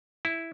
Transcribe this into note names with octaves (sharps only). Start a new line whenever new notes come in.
E4